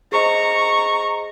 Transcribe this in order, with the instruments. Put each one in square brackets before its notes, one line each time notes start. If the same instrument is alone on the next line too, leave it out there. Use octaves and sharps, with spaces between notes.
[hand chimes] G#4 C5 D#5 [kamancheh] A#5 C#6